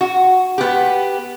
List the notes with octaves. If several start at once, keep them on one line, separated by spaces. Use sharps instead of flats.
F#4
B3 G4